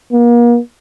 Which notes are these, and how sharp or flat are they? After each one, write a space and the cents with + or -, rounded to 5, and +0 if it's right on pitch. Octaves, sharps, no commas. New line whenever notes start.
A#3 +40